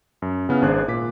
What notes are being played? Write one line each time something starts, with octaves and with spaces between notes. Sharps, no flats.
F#2
C#3 B3 E4 F6
G#1 D4 G#4 C5 F#6
A#2 D6 B6